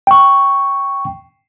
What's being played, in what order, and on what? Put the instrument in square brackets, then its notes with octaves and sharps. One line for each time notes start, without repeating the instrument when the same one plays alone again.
[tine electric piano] G5 C#6